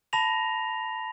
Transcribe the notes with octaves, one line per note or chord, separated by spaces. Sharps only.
A5 B5 A#6 F7